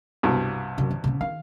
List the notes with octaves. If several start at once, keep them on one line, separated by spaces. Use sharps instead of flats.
C2 G2 B2
F#2 C3
E3
C3 C#4
D#3 F5